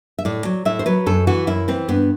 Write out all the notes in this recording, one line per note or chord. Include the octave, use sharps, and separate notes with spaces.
E5
A2 D5
F#3
A2 E5
C5
F#3 B4
F#2 A4
E3 F#4
F#2 E4
E3 C4
G2 B3